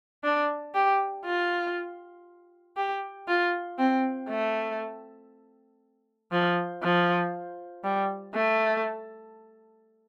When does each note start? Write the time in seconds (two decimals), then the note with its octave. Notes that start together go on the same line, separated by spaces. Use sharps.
0.24 D4
0.75 G4
1.25 F4
2.77 G4
3.28 F4
3.79 C4
4.29 A3
6.32 F3
6.83 F3
7.84 G3
8.34 A3